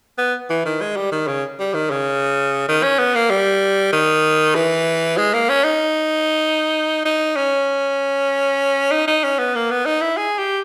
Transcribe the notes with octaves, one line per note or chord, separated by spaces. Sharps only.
B3
E3
D#3
G#3
G3
D#3
C#3
G3
D#3
C#3
D#3
C#4
B3
A#3
G3
D#3
E3
G#3
A#3
C#4
D#4
D#4
C#4
D#4
D#4
C#4
B3
A#3
B3
D#4
E4
G#4
G4